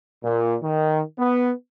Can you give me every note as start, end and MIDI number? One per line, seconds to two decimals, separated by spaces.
0.24 0.56 46
0.62 1.02 51
1.19 1.52 59